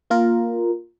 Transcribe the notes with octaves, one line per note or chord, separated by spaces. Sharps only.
A#3 F4 A#4